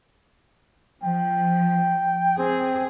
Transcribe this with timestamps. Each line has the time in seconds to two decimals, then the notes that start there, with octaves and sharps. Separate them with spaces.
1.03 F3 G5
2.38 C4 G#4